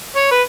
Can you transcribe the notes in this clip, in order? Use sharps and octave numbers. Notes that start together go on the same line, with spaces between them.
C#5
B4